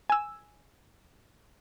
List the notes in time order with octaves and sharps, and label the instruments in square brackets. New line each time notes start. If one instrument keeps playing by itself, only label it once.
[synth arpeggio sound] G#5 E6